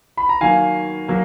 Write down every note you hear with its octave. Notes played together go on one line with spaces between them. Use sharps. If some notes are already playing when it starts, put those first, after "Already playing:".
B5
A#5
D#3 F#3 A#3 F5 G#5
F#3 A#3